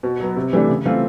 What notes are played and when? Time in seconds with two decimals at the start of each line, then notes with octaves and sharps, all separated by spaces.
0.03 B2
0.20 F#3 B3
0.36 C3
0.53 E3 A3 D4 G4
0.69 C#3
0.85 E3 A3 C4 F4